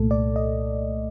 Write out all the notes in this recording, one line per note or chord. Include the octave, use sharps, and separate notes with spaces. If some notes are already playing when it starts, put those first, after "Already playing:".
Already playing: C2 A#2 A3 A4
D5
D#5